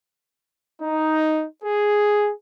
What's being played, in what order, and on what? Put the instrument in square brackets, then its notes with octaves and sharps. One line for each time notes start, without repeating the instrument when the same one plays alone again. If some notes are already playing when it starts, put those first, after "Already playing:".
[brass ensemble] D#4
G#4